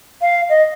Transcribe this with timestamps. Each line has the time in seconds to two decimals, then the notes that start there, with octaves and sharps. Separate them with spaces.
0.22 F5
0.49 D#5